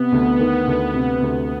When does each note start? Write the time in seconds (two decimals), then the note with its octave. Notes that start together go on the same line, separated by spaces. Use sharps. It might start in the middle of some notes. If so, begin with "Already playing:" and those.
Already playing: C3 B3
0.12 D2
0.40 D#3
0.67 D2
0.94 C3
1.22 D2